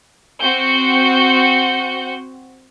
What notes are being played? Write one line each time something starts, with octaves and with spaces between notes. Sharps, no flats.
C4 F#4 G6 C#7